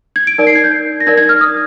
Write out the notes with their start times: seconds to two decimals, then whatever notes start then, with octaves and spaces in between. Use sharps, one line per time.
0.16 G#6
0.27 D7
0.38 D#4 A#4 D5
0.47 C7
0.55 G#6
0.64 G6
1.00 A#6
1.07 D#4 A#4 D5 G#6
1.17 G#6
1.29 F6
1.41 D#6